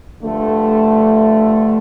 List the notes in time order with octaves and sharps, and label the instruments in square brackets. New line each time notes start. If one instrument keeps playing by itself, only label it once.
[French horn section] G2 D3 F3 A3